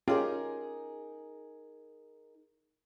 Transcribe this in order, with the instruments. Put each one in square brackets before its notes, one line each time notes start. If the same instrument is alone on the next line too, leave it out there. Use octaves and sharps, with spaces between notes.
[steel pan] C#4 F4 G4 [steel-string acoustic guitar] D#4 G#4 A#4